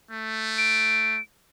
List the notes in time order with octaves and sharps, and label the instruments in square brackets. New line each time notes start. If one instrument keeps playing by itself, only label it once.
[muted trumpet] A3
[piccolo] D7